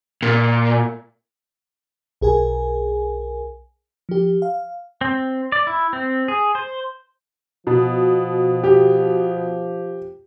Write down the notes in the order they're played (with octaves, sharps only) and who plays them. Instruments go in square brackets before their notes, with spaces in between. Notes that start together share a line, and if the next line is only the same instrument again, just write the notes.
[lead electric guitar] A#2
[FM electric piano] B1 G#4 A#4 G#5
F3 G4
F5
[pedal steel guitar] C4
D5
E4
C4
G#4
C5
[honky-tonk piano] B2 [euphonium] F3
[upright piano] G4